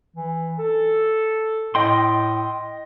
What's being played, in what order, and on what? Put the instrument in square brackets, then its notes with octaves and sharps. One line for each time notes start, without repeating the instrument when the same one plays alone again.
[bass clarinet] E3
A4
[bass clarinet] A2 [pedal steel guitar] D#5 G5 C6